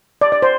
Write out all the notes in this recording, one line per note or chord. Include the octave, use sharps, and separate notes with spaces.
D5
D5
C5